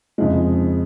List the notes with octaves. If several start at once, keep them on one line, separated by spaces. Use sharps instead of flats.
F2 C#3 F3 G#3